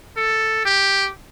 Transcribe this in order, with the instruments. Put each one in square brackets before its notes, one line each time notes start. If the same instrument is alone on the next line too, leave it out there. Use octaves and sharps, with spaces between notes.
[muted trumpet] A4
G4